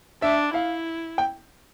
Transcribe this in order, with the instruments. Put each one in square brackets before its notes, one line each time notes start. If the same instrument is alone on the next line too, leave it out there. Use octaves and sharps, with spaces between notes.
[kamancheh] D4 [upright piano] E5
[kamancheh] E4 [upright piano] F5
[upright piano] G5